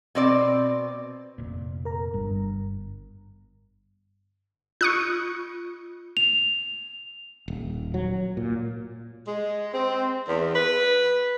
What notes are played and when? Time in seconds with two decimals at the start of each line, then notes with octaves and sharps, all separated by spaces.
0.15 B2 C4 D5
1.38 F1 A#2
1.85 A#4 A#5
2.14 G1 G2
4.81 F4 C#6 D#6 F#6
6.17 F7
7.48 D#1
7.94 F#3
8.37 A#2
9.26 G#3
9.74 C4
10.28 E2
10.55 B4